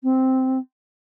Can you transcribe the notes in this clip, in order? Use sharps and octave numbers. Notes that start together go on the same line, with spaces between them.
C4